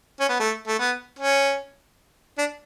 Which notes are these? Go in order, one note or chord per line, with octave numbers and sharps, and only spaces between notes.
C#4
B3
A3
A3
B3
C#4
D4